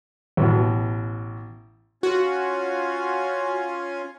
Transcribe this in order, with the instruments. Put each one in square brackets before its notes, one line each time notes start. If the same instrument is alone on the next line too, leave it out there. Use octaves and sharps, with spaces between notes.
[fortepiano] A1 B2
[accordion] C#4 F4 G#5 [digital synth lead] F#4